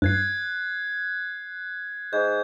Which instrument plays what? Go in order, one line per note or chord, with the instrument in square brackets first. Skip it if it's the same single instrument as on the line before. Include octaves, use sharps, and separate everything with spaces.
[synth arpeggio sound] G2 [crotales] F#6 G#6 C7
[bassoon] G#2 [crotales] G6